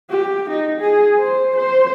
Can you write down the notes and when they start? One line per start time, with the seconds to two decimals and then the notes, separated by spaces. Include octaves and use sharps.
0.10 G4
0.50 D#4
0.81 G#4
1.19 C5
1.57 C5